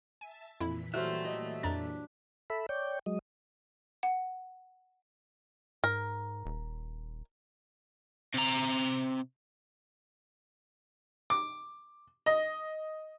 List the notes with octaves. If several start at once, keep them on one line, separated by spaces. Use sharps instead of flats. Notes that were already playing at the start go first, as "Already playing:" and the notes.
E5 G#5 A5
F2 A#2 E3 E4 B5 B6
F#3 G3 A4 C5 E5 F6 F#6
D#5
F2 D4 A#5 A6
A4 E5 B5
C#5 D5 G5
F#3 G#3 D#5
F#5
G#2 A#4
D#1
C3 A#5
D6
D#5